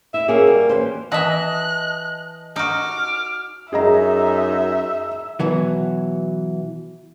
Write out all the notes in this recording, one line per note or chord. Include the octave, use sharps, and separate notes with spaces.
E4 E5
A#3 C#4 G#4
G3
E3 C#4 C5
E3 D#5 E5 A5 D#6 F#6
D#4 F#4 D6 F6
F#2 D#4 G#4 D#5 E5 A#5
B2 E3 F#3